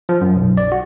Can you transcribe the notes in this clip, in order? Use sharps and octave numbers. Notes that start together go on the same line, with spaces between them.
F3
F#2
B1
D5
F#4